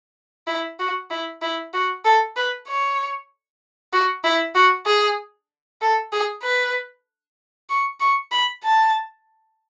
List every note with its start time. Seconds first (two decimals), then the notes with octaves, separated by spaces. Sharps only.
0.47 E4
0.79 F#4
1.10 E4
1.42 E4
1.73 F#4
2.05 A4
2.36 B4
2.68 C#5
3.93 F#4
4.24 E4
4.55 F#4
4.86 G#4
5.81 A4
6.12 G#4
6.43 B4
7.70 C#6
8.00 C#6
8.32 B5
8.64 A5